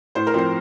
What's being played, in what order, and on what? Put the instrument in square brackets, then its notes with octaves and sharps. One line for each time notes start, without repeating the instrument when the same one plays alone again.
[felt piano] A2 C5
A#4
F3 C4 C5